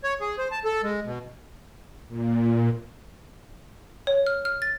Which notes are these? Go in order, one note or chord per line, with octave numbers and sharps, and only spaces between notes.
C#5
G#4
C5
A5
A4
G#3
B2
A#2
C#5
F6
F6
A6